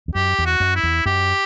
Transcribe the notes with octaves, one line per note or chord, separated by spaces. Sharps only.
E2
F#2 G4
E2
F#4
F#2
E4
E2
F#2 G4